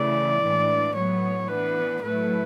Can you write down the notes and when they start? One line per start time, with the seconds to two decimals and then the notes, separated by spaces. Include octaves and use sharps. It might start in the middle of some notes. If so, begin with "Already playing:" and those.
Already playing: C#3 E3 A3 E4 D5
0.42 A2 E3 G#3 D4
0.95 A2 F#3 B3 C#5
1.48 E3 B3 D4 B4
2.02 A2 F#3 A3 E4 B4